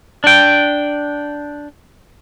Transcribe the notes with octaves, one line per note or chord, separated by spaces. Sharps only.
D4 G5